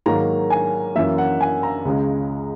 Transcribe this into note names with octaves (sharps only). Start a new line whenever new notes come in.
G#2 D#3 F#3 A#3 A#5
G#5
F#2 E3 A#3 E5
F#5
G#5
A#5
C#2 C#3 G#3